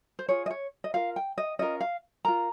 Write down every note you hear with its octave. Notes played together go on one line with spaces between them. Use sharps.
C5
F4 G#4 C#5
D#5
C#5
D#5
F4 A#4 F5
G5
D#5
C#4 F4 A#4 D#5
F5
F4 A#4 A#5